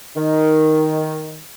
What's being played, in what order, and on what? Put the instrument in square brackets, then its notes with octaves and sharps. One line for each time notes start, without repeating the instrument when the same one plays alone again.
[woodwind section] D#3